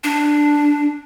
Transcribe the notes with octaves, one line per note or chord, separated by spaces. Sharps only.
D4